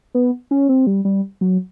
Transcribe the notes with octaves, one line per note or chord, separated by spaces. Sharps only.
B3
C#4
C4
G3
G3
F#3